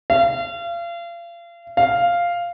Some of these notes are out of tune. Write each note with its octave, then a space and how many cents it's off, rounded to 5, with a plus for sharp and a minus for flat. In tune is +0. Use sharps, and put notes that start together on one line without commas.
F5 -35
F5 -5